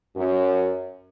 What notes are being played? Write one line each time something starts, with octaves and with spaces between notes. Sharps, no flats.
F#2